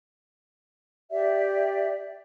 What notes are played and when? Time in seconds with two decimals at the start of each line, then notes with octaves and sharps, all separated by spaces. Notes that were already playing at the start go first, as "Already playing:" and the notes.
1.11 G4 D5 E5